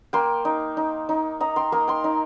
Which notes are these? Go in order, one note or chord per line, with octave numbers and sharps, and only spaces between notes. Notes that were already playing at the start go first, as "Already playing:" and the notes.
A#3 G5 C6
D#4
D#4
D#4
D#4 A#5 D#6
G5 C6
A#3 A#5 D#6
G5 C6
D#4